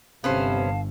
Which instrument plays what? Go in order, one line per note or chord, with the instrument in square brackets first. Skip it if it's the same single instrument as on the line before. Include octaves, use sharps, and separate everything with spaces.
[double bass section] G1 [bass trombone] C3 [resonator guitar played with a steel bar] B3 C#4 C5 [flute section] F5 A5